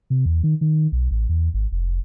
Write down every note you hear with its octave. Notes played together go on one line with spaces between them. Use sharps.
C3
E2
D#3
D#3
B1
A1
E2
G#1
F1